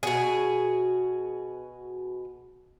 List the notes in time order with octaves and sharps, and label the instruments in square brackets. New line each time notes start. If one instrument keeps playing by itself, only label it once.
[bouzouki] B2 F#4 G#4